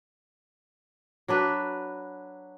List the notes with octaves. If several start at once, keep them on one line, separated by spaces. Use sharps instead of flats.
F#3 D4 B4